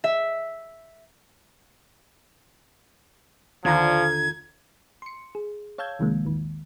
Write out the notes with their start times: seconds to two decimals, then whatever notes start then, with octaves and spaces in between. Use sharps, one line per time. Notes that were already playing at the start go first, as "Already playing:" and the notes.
0.04 E5
3.65 D#2 D3 F3 F4 A#5 G#6
5.02 C6 C#7
5.35 G#4
5.78 C#5 F5 A5 E6 G6 G#6
5.99 C2 C3 D#3 F3 G#3 A#3
6.25 A1 D#2 D#3